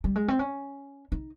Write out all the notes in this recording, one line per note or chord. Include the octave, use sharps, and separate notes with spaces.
G3
G#3
C4
C#4
D#4